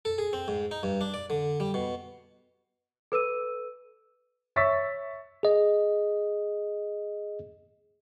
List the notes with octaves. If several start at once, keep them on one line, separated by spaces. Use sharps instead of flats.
A4
G#4
C4
G#2
D#4
G2
D4
D5
D3
G3
B2
A4 B4 E6 D#7
C#5 E5 C#6 E6 A6 B6
G#4 D#5